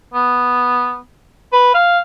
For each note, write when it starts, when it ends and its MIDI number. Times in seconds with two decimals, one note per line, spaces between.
0.14 0.98 59
1.53 1.74 71
1.74 1.99 77